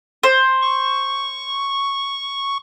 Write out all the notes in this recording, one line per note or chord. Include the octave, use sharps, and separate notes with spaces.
C5
C#6